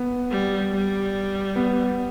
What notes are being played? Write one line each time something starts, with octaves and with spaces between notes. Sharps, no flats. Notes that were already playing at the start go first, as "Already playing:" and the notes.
Already playing: B3
G3
G3
B3